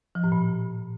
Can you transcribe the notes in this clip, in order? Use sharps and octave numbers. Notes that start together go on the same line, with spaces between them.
F3
A2
A#2